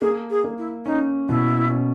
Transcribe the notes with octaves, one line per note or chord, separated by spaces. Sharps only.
A#3 G#4
G#4
A#3
E4
C#4 D#4
B2 E4
C#4